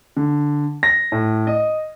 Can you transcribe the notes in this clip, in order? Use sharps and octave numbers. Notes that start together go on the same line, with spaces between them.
D3
A#6
A2
D#5